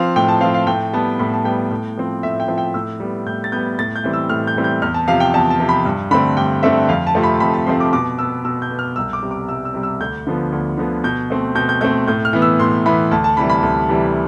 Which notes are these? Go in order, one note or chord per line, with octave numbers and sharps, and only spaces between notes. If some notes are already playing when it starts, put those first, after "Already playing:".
Already playing: F3 C4 F5
A2 G5
A5
F3 C4 F5
F5
A2 G5
G3 B3 A5
A2 B5
A5
G3 B3 G5
A2
F3 C4
A2 E5
G5
F3 C4
G5
A2 E6
G3 B3
A2 G6
A6
G3 B3 G6
A2 A6
G6
E3 G3 C4
E6
A2 F6
G6
E3 G3 C4
G6
E2 F6
A5
C3 F3 F5
G5
E2 A5
A5
C3 F3
B5
G2
D3 A3 C4 B5
G2 G5
D3 A3 C4 E5
F2 F5
A5
C3 F3 A3 C4
B5
F2 B5
A5
C3 F3 A3 C4 C6
D6
B2 D6
B3 E6
B2 E6
G6
B3
F6
C2 E6
D6
C3 G3
D6
C2 E6
E6
C3 G3
E6
D2 G6
D3 F3 B3
D2
D3 F3 B3
B2 G6
A3 C4
B2 G6
G6
A3 C4 G6
A2 G6
F6
E3 B3
E6
A2 C6
E3 B3 B5
D2 A5
A5
C3 E3 G3 B5
B5
D2
C3 E3 G3